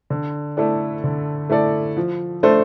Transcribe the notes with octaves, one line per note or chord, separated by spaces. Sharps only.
D3
A3 E4 A4 D5
D3
A3 E4 A4 D5
F3
A3 D4 A4 C5